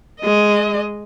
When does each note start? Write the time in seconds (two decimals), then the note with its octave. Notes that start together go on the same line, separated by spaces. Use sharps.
0.21 G#3 D#5